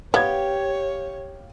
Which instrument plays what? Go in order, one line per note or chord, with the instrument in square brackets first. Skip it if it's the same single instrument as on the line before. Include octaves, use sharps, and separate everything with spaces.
[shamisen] B3 [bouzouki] G4 [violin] C#5 [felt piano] F5 G#6